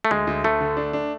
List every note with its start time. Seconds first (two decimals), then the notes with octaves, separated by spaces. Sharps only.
0.05 A3
0.11 D2 G#3
0.27 D2
0.44 D2 A3
0.60 D3
0.77 D4
0.93 D4